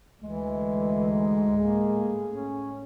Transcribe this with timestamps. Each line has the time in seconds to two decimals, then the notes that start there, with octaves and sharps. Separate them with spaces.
0.23 D2 E3 G#3
1.06 G#2
1.57 A2 A#3 G#4
2.29 C#4